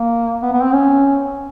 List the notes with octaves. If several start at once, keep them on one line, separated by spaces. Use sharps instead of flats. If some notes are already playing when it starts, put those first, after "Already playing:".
Already playing: A#3
B3
B3
C4
C#4